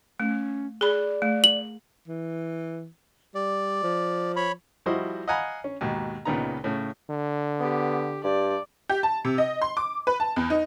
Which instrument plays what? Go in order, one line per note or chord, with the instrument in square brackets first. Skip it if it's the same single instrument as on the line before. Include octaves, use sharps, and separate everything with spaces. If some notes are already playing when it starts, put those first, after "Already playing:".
[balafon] A3 [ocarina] C#4
[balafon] G#4 B5 [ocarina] D5
[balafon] A3
[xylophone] F#7
[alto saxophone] E3
[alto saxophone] G3 [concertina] D5
[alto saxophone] F3
[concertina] C#5 B5
[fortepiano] F3 G3 E4 F#4 C5 D#5
D#5 F5 F#5 G#5 A#5 B5
C#4
D#2 G#2 B2
C#2 A#2 C#3 B3 D#4 A#5
A2 C#3
[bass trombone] D3
[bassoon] B3 [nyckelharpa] G4
[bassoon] G2 [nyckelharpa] D5
[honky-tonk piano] G4
A5
C3
D#5
C6
D6
B4
A5
E2
D#4